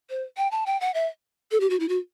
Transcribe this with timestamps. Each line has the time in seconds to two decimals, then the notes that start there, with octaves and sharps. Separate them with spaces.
0.10 C5
0.37 G5
0.51 A5
0.66 G5
0.81 F#5
0.94 E5
1.51 A4
1.60 G4
1.70 F#4
1.80 E4
1.89 F#4